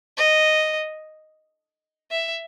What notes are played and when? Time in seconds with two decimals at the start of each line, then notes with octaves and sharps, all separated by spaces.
0.17 D#5
2.11 E5